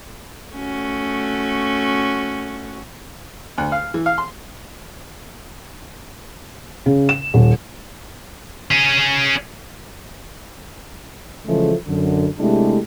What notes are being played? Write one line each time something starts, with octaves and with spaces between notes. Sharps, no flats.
A3 C#4 F#4
D2
F5
E3
F5
C6
C#3
E7
D#1
C#4 G#4
C#3 E3 F3 G#3 A3
F#2 D3
C3 G#3 A3 D4 E4 G4